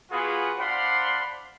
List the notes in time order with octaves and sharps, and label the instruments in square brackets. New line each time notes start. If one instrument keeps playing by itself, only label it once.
[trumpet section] B3 F4 F#4 G#4
D4 C5 F5 F#5 B5 C6